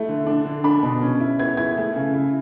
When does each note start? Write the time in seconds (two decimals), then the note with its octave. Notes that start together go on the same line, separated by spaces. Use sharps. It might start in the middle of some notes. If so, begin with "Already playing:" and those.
Already playing: A3 E4
0.09 D3
0.27 D4
0.45 D3
0.64 D4 B5
0.83 B2
1.02 C#4
1.20 E4
1.39 B3 G#6
1.57 E4 G#6
1.77 A3
1.96 C#3
2.14 E4